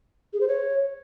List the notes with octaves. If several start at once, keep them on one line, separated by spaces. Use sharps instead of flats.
G#4
C5
C#5